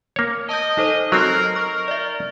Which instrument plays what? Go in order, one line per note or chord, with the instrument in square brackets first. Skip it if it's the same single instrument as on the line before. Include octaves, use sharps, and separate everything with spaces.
[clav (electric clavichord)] A#3 C#5
[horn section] D#5 [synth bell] A5 D#6 G6
[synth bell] D#4 A4 C5
[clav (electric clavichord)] F#3 C4 [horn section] A#4 [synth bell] D#5 F#6 C7
[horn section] A#4 [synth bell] C#6 F6
[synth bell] D5 E5